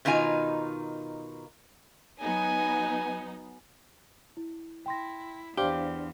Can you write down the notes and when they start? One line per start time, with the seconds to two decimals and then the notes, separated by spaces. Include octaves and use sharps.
0.05 B2 D#3 D#4 F4 G#5
2.21 F#3 B3 D#4 G#5
4.37 E4
4.86 E4 G5 C6 A#6
5.57 E2 D4 G4 C5 F5 G7